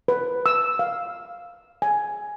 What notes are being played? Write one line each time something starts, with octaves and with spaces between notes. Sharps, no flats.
B4
E6
F5
G#5